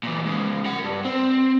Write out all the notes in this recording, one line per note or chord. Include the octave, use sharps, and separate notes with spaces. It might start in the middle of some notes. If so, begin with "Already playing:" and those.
A#2 E3
G#2 C#3
A#4 F#5
G2
C4